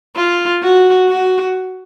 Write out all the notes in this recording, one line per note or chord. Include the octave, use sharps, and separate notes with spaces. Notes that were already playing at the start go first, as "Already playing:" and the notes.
F4
F#4
F#4